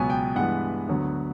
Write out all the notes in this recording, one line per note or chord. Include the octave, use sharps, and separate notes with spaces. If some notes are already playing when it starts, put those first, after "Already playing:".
Already playing: C#2 B2 F#3 B3 G#5
G5
G2 E3 G#3 B3 F#5
D2 D3 F#3 B3